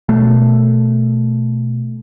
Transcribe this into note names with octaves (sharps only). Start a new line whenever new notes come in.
B2 A3